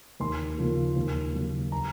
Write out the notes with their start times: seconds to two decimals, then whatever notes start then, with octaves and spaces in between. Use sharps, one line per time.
0.20 D#2 C6
0.58 C#3 F3 A#3
0.96 D#2
1.34 C#3 F#3 A#3
1.72 A#5